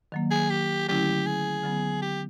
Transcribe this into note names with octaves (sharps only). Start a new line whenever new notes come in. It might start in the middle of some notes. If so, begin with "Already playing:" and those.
D#3 F#3 A#3
G#4
G4
D3 F#3 A3 C#4 E4 G4
G#4
D3 F#3 B3
G4